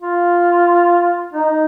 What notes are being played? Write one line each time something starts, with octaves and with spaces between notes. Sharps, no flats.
F4
D#4